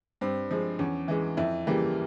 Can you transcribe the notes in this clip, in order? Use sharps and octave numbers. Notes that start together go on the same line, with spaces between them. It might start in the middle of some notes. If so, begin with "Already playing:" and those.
G2 C4
F3 G#3
E2 C#4
E3 G#3
F2 E4
C#3 E3 G3 A#3